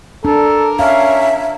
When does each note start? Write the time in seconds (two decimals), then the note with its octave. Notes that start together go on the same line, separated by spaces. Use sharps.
0.25 D4 A4 A#4
0.79 C#4 E5 F5